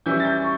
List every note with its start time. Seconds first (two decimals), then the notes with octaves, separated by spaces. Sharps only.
0.06 E3 G3 C#4 E4 G6
0.20 A6
0.25 G6
0.42 C#6